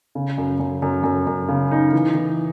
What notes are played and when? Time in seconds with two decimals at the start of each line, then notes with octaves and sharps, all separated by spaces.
0.15 C#3
0.38 F#2
0.60 F#2
0.82 F#2
1.04 F#2
1.27 F#2
1.49 C#3
1.71 D#4
1.93 E3
2.15 E3